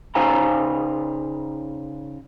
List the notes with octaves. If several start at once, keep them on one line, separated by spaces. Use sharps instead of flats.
C#3 D#4 C5 F5 G#5 A#5